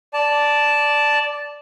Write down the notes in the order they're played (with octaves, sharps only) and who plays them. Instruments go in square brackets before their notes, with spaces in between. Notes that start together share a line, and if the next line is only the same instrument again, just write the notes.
[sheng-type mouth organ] D5 A5